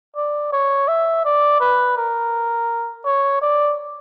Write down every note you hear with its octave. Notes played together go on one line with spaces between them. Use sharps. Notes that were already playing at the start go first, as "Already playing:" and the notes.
D5
C#5
E5
D5
B4
A#4
C#5
D5